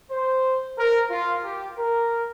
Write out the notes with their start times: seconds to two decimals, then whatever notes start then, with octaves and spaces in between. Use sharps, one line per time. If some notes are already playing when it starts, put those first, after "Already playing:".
0.11 C5
0.78 A#4
1.11 F4
1.44 G4
1.78 A#4